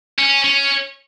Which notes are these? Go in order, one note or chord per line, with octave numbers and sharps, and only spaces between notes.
C#4
C#4